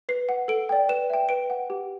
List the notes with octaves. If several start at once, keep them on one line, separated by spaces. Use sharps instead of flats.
B4 C7
F#5
A4 D7
D5 G5
B4 E7
E5 G5
B4 D7
F#5
G4